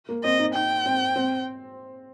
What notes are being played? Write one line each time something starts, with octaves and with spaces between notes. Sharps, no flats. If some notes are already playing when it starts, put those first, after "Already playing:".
A#3
C4 D#5
D#4
D#4 G5
C4
C4